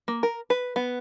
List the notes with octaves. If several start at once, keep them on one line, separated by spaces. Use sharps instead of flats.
A#3
A#4
B4
B3